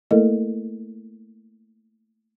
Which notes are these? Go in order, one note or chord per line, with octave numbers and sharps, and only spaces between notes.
A3 A#3 E4 A4 A#4 D#5